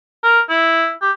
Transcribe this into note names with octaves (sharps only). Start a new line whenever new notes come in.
A#4
E4
G4